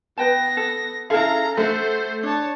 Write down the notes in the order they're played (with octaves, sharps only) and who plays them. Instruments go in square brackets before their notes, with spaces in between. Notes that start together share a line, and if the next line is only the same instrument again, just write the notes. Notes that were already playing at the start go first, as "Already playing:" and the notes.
[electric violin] B3 A#6 [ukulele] B4 G5 A5
[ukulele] A4
[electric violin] C#4 A#5 [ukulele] E4 G#4 [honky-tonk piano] A4 F5
[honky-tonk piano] A3 [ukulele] F#4 [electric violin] C5
[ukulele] D4 [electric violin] C#5 A5